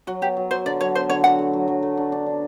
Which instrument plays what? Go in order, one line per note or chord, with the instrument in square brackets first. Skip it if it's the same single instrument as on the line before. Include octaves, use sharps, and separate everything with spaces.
[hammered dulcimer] F#3 [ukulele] F#4
[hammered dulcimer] B3 [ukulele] G4
[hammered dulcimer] F#3
[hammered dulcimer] F#3 [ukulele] C5
[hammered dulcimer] D3 [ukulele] D5
[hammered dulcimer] F#3 [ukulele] C#5
[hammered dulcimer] B3 [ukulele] C5
[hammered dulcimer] D3 [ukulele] C#5
[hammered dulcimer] F#4 [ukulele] F#5
[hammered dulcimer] A3
F#3
F#3
A3
D4
D4
D4